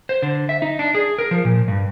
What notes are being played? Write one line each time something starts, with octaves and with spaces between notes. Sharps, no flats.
C5
D3
E5
D#4
D4
G#4
A#4
F3
A#2
G2